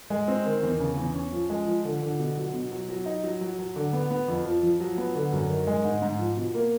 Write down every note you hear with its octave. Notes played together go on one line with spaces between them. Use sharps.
G#3
C4
D#3
E2
C#3
E2
C#4
F3
G#3
F3
D3
D3
B2
F#3
B2
F#3
F#3
D#4
F#3
F#3
F#3
D3
B3
B3
F2
F3
F3
F#3
B3
D3
F#2
D#3
G#3
G#2
G#2
F3
B2
A#3